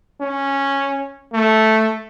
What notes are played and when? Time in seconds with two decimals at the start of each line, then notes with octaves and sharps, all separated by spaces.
0.20 C#4
1.33 A3